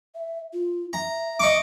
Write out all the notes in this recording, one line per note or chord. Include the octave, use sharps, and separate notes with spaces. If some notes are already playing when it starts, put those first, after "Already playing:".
E5
F4
E5 A#5
D#5 C#6 D6